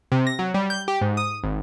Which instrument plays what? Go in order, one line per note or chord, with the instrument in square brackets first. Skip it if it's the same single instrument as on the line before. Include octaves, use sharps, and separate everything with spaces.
[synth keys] C3
A#6
F#3
G3
G6
G4
G#2
D#6
G#1